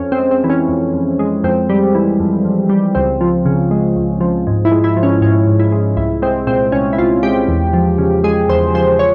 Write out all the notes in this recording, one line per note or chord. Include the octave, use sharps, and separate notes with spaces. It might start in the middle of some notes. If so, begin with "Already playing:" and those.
Already playing: F2 C#4
C4
G#3
C4
E3
C#4
F2
F2
G#3
F2 C4
G3
E3
F2
F2
G3
C#2 C4
F3
C#3
G#3
C#2
F3
G#2
E4
G#3
E4
F3
C#4
G#2 C#4
G#2
E4
G#3
C2 E4
G#3 C4
A#2 C4
C2 C#4
E4
C2 F4
G#3 G4
E2
F3
C#3
G#3 G#4
E2 C5
F3 C5
C#5